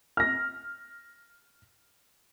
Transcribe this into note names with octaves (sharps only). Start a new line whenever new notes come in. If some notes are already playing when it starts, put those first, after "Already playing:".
F6 A#6